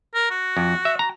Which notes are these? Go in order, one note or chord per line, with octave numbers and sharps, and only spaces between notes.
A#4
F#4
F2
E5
A#5